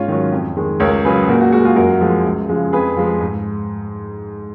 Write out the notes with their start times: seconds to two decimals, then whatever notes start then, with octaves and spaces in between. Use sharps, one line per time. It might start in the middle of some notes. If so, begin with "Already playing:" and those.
Already playing: G#2 C#4 F4
0.08 D#3 F#3
0.32 F2
0.57 D#3 G#3
0.80 C#2 A#4 C#5
1.04 C#3 F#3 G#4 B4
1.28 A#2 F#4 A#4
1.40 F#4 A#4
1.53 G#3 F#4 A#4
1.64 F4 G#4
1.76 F#2 F#4 A#4
2.01 F3 G#3
2.25 C#2
2.49 C#3 F3 G#3
2.73 F2 G#4 B4
2.97 F3 G#3
3.21 G#2